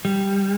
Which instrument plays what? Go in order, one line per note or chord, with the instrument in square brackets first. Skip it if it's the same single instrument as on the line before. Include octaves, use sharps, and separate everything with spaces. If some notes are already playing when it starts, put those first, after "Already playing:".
[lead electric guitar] G3